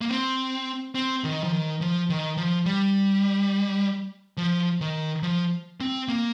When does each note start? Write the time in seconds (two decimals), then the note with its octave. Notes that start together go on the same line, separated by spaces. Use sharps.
0.01 A#3
0.09 C4
0.95 C4
1.24 D#3
1.44 F3
1.53 D#3
1.81 F3
2.10 D#3
2.37 F3
2.66 G3
4.37 F3
4.81 D#3
5.23 F3
5.81 C4
6.08 A#3